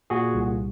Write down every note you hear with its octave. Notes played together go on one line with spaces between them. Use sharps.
A#2 F#4 G#4
C2